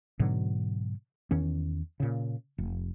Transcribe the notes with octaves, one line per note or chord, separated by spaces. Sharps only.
G#2 B2 D3 F#3
E2 D#3 C#4
A#2 C#3
F1